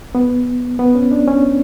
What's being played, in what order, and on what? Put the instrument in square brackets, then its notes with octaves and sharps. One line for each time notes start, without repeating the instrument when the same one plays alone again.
[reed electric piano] B3
B3
C#4
D4
C#4